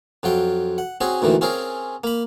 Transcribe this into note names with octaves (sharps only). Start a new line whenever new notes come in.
F2 F#3 F4 G5
F#5
C4 C#4 F#4 G#4
D2 A#2 D#3 E3
C4 C#4 F4 G#4 A#4
A#3 B5